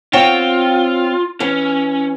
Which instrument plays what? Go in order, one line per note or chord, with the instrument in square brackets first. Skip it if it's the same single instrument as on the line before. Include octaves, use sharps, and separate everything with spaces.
[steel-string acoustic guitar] C4 C#5 G5 [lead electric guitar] F4
[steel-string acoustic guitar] E3 [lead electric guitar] C#4